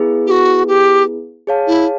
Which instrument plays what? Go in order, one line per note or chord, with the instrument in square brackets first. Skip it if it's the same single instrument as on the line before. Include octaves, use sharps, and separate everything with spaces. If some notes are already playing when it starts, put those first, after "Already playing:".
Already playing: [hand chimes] B3 E4 G#4 B4
[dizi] G4
F#4
G4
[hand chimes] G#4 C#5 F5 A5
[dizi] E4